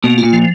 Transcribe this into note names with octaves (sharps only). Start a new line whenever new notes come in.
B2 A#3
F4
A#2
F3